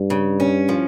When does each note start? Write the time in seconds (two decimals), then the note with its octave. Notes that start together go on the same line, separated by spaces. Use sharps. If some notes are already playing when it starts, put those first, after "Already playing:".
Already playing: G2
0.10 C#3
0.40 C#4
0.69 F3